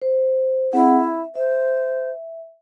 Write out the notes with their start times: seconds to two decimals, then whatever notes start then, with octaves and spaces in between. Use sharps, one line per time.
0.02 C5
0.73 C4 E4 G#4 F#5
1.01 E5
1.36 C5 E5